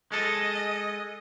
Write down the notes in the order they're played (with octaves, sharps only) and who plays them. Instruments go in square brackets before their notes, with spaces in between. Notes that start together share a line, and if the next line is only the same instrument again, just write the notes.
[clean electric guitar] G#3 A4 [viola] D#5